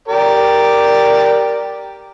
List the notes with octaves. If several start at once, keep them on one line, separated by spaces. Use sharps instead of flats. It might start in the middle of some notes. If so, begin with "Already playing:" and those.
G4 A#4 D5